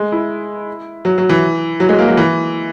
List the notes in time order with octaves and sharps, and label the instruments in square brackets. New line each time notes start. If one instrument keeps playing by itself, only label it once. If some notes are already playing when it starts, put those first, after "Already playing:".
Already playing: [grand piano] G#3
E4
F#3
F#3
E3
F#3
G#3
A#3
F#3
E3